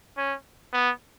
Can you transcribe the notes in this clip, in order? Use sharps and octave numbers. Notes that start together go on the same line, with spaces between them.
C#4
B3